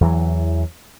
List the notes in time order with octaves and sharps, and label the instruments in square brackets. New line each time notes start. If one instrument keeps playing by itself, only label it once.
[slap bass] E2 E3 F#3